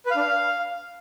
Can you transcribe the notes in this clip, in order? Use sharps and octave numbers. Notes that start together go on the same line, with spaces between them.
B4
F5
D4
F5